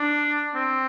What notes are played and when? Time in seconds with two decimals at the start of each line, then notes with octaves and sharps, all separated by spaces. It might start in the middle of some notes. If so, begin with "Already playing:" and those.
Already playing: D4
0.55 C4